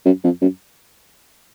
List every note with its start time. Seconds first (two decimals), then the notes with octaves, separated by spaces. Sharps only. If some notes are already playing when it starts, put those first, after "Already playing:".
0.05 F#2
0.24 F2
0.41 F#2